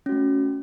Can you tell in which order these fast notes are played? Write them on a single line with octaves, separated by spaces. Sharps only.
C#4 F#4 A3